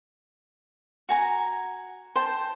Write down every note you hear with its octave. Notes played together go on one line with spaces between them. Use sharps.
F#4 G#5 A#5
C5 G5 A5